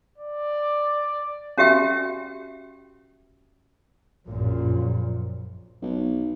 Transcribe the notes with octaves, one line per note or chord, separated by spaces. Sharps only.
D5
C#4 F#4 G4 E5 G5
A#1 F#2 A#2
B1